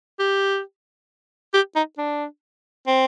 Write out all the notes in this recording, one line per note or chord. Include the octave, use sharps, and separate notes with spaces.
G4
G4
D#4
D4
C4